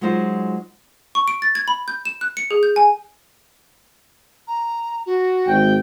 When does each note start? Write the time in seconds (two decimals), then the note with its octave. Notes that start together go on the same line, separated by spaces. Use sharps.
0.01 F#3 G#3 D#4 F4 C5
1.15 C#6
1.28 D7
1.42 A6
1.55 G#6
1.68 B5
1.88 G6
2.05 E7
2.21 F#6
2.37 C#7
2.51 G#4
2.63 G6
2.76 G#5
4.47 A#5
5.06 F#4
5.46 G#1 G5